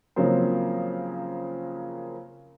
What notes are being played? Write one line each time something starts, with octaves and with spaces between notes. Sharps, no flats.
C#3 F3 F#3 A#3 C4